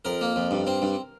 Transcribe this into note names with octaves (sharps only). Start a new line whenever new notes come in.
F2 A#4
A#3
F2
G2
C4
G2